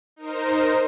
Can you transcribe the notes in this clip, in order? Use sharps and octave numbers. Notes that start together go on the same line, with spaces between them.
D#4 A#4 C5